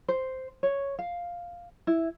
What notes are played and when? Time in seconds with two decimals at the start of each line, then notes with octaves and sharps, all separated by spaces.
0.08 C5
0.63 C#5
0.99 F5
1.87 E4